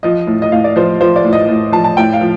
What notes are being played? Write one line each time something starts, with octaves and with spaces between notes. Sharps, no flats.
F3 D#5
A2
D#5
A2 F5
D5
F3 C5
F3 C5
D5
A2
D#5
A2
F3 A5
A5
A2 G5
F5
F3